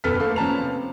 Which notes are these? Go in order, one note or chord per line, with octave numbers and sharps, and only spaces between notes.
F#1 B2 A4 B4 F6 B6
A3 A#3
F3 C#4 B4 A5 A#5 F7
C3